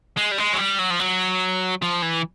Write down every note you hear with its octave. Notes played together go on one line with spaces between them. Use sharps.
G#3
G3
G#3
F#3
G3
F#3
F3
F#3
F3
E3